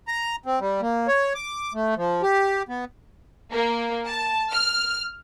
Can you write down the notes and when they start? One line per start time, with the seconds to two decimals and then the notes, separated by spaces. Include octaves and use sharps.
0.08 A#5
0.46 C4
0.60 G3
0.81 A#3
1.08 C#5
1.35 D6
1.74 A3
1.97 F3
2.23 G4
2.69 B3
3.51 A#3
4.06 A5
4.51 F6